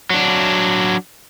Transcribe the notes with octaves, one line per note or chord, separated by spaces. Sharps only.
F#3 D4